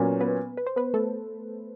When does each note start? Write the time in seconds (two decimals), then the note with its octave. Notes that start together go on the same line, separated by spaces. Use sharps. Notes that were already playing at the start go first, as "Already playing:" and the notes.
Already playing: A#2 F#3 A#3 B3 C#4 B4
0.21 B3 B4
0.57 B4
0.67 C5
0.76 B3 B4
0.94 A3 A4